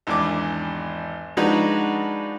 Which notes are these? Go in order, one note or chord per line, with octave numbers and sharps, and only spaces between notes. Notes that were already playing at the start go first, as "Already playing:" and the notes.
G#1 E2 D4 D6
F3 G#3 D4 D#4 F#4 B4